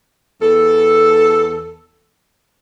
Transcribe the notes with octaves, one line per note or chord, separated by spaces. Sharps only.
E2 A4